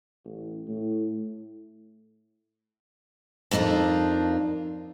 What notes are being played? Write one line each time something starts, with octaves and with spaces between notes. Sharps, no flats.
A1
A2
F2 A#3 D4 D#4 F4